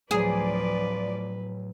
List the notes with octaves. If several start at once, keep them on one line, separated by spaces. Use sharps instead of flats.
D2 A2 F3 F#3 G#4 B4 D5